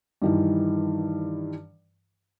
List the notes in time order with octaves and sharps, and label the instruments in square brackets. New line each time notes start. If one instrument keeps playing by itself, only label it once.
[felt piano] G2 D#3 E3